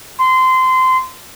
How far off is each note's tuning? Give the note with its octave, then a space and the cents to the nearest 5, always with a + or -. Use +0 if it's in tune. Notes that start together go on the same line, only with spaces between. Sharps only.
C6 -20